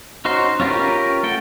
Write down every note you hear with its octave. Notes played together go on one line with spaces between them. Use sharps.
C#4 D#4 F#4 C5
C#4 F4 G4 A#4 B4
A3 A4 F#5 G5